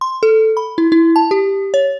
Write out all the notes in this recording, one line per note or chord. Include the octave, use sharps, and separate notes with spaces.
C6
A4
B5
E4
E4
A5
G4
C#5